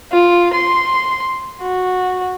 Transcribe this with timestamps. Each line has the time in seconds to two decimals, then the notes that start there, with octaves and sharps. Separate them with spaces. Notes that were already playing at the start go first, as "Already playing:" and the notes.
0.12 F4
0.53 C6
1.62 F#4